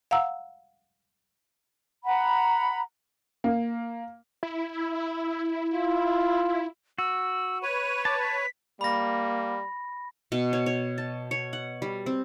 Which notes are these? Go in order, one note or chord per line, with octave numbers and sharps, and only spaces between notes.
F5 F#5 A#5 E6
F#5 A#5 B5
A#3
E4
F4
F#4 E6
B4 C#5 D#7
A5 D6
B6
G3 A#3 B5 A#6
B2
C#5
C#5
A5
C#5
F#5
G3
C4